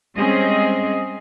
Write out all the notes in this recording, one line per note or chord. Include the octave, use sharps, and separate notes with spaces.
G3 G#3 C4 C#4 G#4 D#5